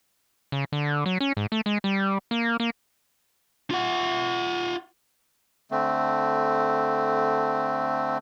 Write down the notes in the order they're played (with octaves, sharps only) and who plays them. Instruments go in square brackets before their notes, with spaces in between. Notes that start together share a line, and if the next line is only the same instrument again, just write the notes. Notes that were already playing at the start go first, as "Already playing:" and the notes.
[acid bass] C#3
D3
F#3
C#4
G#2
A3
G#3
G3
A#3
A#3
[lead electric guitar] F4 F#5
[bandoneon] D3 A3 C4